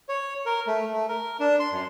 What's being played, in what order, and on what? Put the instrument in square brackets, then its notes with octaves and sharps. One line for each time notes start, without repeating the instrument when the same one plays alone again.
[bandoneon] C#5
A#4
A3
A3
A#4
D4
C6
F#2